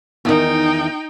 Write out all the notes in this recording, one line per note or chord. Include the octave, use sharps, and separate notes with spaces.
E2 D#3 D#4 G5